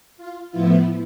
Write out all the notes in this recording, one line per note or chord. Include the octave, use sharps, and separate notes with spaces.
F4
A2 F3 B3 E4 F4